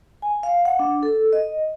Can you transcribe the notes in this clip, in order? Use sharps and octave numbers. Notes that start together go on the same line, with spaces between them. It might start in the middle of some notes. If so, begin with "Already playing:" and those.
G#5
F5
F#5
D4
A4
D#5